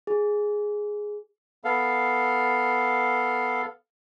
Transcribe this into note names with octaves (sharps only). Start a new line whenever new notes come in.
G#4
B3 A4 F5